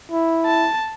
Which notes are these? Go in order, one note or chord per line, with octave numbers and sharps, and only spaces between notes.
E4
A5